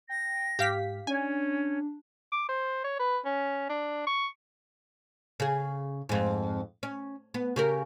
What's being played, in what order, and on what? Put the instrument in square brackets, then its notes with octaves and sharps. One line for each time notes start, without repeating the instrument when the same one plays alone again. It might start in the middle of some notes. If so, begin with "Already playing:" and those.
[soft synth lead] G5 [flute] A#6
[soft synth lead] G#2 [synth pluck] G4 F5 B6
[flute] C#4 [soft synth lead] D4 [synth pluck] G#5
[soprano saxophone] D6
C5
C#5
B4
C#4
D4
C#6
[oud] C#3 G#4
F2 G#2
C#4
B3
C#3 G4 A#4